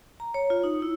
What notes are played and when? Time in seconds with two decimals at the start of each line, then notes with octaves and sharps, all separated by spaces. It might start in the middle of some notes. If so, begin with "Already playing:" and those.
0.20 A#5
0.34 C#5
0.50 F4
0.64 D#4
0.82 E4